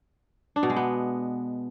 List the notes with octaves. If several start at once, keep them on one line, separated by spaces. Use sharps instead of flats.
D4
B2
G#3
B3